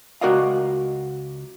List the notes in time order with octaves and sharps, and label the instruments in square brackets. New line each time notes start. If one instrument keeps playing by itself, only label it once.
[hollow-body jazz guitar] C#2 F#4 A#4 D5 D#5 F5